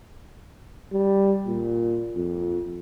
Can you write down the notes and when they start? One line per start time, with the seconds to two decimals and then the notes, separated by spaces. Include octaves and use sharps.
0.92 G3
1.46 A#2
2.16 F2